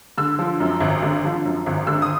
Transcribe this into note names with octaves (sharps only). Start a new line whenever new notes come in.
D3 E6
F3
F#2
G#1
D3
F3
F#2
G#1
D3 E6
D#6